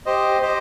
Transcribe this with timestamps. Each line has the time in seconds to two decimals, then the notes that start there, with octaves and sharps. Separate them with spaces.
0.06 G4 C5 D#5
0.42 G4 C5 D#5